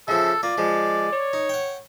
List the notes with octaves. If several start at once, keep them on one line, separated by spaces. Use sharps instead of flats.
C#3 F3 A4 E5
A#3 F4 D5
F3 G#3
C#5
D#4
F#5 G5